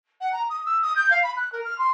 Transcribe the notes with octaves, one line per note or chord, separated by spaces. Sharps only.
F#5
A#5
D#6
E6
D#6
G6
F5
B5
F#6
A#4
F6
C6